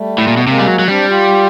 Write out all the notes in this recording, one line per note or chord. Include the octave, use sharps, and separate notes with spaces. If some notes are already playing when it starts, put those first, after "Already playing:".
Already playing: G3 A3
A2
A#2
B2
C3 G#3 A#3
G3
F#3
F#3
G3 C4 D4
F4 G4